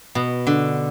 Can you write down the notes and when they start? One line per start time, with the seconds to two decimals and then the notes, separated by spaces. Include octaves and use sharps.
0.15 B2
0.47 D3